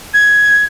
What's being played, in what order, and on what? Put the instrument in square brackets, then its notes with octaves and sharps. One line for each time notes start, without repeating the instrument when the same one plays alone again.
[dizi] G#6